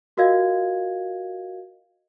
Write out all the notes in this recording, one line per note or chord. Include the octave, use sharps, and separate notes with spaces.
F4 F#4 A#4 D#5 F5 G#6